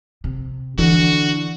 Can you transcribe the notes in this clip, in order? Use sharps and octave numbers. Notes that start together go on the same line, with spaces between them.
C3
D3 E3 F#4